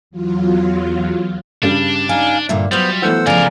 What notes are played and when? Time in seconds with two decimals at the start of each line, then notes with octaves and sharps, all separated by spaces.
0.11 E2 F#3 F4
1.62 G2 C#3 G3 D4
2.09 D#4 F5 G#5
2.49 G2 A#2 D3 A#3 E5
2.71 F#3 G3 B3 F4 C5
3.02 E3 A3 B3 C5 F#5 E6
3.26 C#2 C#3 F3 A#4 D5 F5 G#5